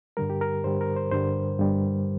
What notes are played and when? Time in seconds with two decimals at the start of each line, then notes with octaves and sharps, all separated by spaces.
0.17 G2 D3 G3 A#4
0.30 G4
0.41 A#4
0.64 G2 D3 G3 C5
0.81 A#4
0.96 C5
1.11 G2 D3 G3 C5
1.60 G2 D3 G3